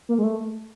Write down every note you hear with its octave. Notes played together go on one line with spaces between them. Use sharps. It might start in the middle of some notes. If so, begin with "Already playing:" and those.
A#3
G#3
A3